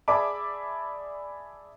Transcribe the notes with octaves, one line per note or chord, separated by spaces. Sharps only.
G#4 D5 E5 A5 B5 D6